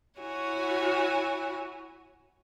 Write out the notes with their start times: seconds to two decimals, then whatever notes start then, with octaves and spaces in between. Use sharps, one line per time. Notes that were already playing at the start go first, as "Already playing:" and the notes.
0.20 E4 F#4 C#5 G#5